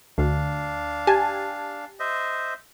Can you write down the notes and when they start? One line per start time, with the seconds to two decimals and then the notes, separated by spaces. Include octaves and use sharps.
0.18 D2 D4 F5
1.07 G4 G#5 A5
2.00 C5 D#5 E5